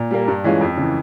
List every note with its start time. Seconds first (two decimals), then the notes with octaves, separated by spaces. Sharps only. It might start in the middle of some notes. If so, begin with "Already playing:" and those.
Already playing: A#2
0.11 G3 A#3
0.28 G2
0.44 E3 G#3 C#4 F4
0.61 F2
0.77 C#3 E3